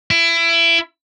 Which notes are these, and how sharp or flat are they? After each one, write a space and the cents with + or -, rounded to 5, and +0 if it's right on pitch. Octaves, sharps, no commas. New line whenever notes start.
E4 +25